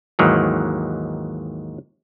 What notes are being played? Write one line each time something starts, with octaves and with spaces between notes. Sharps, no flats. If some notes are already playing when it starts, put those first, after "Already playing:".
D#2 G#2 D#3 E3 F#3